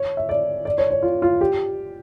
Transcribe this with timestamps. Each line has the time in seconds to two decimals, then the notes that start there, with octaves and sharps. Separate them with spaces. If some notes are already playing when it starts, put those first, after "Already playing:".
Already playing: C#5
0.17 E5
0.29 D5
0.65 D5
0.78 C#5
0.91 C#5
1.02 F4
1.22 F4
1.41 G4